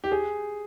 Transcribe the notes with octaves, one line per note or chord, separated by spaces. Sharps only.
G4
G#4